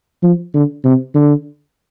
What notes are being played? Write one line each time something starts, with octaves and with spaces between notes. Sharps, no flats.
F3
D3
C3
D3